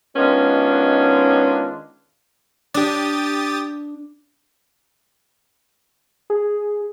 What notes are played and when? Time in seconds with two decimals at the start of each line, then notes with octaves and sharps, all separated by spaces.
0.16 D#3 G#3 B3 C#4 D4 F4
2.74 D4 G4 D#6 A6
6.30 G#4